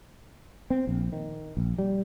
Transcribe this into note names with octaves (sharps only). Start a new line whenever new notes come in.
C4
A#1
D#3
A#1
G3